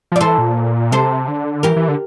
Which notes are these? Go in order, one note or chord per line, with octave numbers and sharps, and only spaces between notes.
F3
D5
E3 A4 C5
A#2
C3 A4 C5
D3
E3 G4 A#4
E3
D3